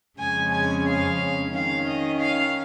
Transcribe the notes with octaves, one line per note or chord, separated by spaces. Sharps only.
F2 C#3 G#3 C#4 G#5
G#5
F5
D#3 C#4 F5
D#5
F5